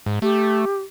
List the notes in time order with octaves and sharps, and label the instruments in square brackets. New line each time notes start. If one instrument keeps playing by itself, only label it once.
[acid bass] G#2
[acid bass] A3 [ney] G4